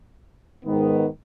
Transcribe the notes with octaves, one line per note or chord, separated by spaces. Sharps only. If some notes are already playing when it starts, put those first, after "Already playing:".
G#2 D#3 B3